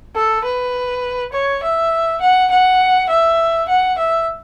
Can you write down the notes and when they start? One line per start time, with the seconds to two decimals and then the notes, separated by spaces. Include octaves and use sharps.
0.15 A4
0.44 B4
1.33 C#5
1.63 E5
2.21 F#5
2.51 F#5
3.10 E5
3.69 F#5
3.98 E5